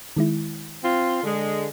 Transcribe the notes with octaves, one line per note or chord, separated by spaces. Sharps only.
D#3 G#3 E4
C4 F4
D3 G#3